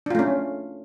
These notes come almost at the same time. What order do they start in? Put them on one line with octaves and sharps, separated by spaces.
D4 F4 A3 C#4